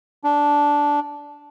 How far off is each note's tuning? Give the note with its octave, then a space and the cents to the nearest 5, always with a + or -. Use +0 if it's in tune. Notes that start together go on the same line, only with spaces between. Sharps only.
D4 -10